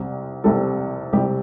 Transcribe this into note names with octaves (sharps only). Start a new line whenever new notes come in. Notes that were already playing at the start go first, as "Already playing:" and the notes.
Already playing: C2 C3 G3
C2 C3 G3 A4
C2 C3 G3 G4